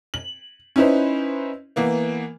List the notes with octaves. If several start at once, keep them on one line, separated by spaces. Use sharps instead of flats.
F#7
C#4 D#4 E4 B4 C5
E3 A#3 B3